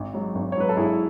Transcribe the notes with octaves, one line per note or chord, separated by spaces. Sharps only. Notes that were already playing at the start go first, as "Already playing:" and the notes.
Already playing: G#1
G#2 F#3
G#1
C#5
G#2 F#3 B4
A4
G#1 E4 G#4